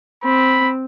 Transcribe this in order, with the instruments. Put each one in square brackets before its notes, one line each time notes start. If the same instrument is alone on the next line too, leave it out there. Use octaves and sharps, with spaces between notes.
[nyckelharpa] C4 [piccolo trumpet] B5